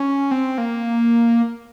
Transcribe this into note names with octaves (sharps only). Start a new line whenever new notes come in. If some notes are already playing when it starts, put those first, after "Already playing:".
Already playing: C#4
C4
A#3